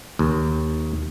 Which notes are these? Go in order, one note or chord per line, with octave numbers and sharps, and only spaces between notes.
D#2